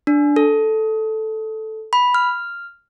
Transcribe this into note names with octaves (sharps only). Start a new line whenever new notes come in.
D4
A4
B5
F6